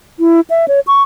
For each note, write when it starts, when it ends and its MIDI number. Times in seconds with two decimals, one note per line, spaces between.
0.20 0.40 64
0.50 0.66 76
0.68 0.80 73
0.87 1.03 85